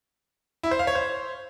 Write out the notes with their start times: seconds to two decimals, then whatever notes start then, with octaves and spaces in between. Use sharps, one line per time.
0.63 E4
0.71 C5
0.79 F5
0.87 C#5
0.95 C5